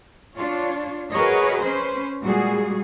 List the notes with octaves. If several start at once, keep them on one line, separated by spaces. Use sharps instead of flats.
D4 F4 C#5
F#4 G#4 A#4 B4 C#5 D#5
C#4 B4 C5
A#2 G3 G#3 F#4 G#4